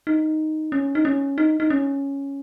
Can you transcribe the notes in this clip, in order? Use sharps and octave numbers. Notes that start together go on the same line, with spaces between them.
D#4
C#4
D#4
C#4
D#4
D#4
C#4